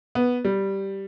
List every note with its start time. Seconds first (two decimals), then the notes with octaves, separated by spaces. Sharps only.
0.15 B3
0.45 G3